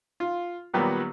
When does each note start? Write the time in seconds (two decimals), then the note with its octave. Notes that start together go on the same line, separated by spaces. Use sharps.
0.20 F4
0.74 A#2 D#3 F#3 G3 A#3 B3